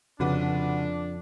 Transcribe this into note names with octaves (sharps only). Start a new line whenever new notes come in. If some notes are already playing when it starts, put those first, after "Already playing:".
F1 F2 C#3 D4 F#4 B4